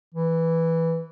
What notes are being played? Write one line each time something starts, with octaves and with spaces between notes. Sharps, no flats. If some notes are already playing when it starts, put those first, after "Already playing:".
E3